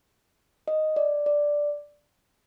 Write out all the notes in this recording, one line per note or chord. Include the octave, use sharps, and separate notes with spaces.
D#5
D5
D5